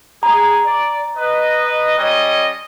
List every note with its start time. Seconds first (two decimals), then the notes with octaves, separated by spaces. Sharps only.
0.23 G#4 A#5
0.65 D5
1.17 B4 D#5
1.97 G3 C#4 D#5